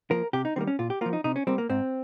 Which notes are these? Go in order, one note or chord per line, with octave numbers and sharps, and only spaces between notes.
F3 A#3 A#4
C3 G4
D#4
D#3 G3 A#3 C4
C#4
A#2 F4
G4
F3 A#3 F4
D#4
C3 D#4
C#4
G3 A#3 C4
A#3
G#2 C4